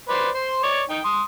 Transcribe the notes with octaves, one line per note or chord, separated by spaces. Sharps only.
B4 C5 D5
C5 C6
C#5 D5
D#4 G5
C6 D#6